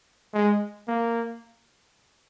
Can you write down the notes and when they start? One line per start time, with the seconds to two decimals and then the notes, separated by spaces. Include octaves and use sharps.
0.34 G#3
0.88 A#3